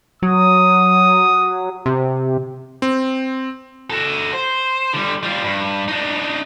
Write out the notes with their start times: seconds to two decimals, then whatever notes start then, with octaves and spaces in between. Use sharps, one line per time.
0.22 F#3 D#6
1.86 C3
2.82 C4
3.90 F#4 A4
4.33 C5
4.93 D3 G3
5.23 G3 F4
5.44 G2
5.88 D4 D#4